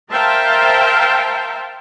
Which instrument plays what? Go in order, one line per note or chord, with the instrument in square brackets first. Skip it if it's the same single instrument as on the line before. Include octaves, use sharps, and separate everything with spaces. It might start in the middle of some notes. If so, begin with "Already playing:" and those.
[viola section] A#4 C5 E5 F5 G5 A5